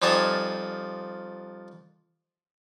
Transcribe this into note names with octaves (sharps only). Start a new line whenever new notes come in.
F2 F3 G3 D#4 G#5 A5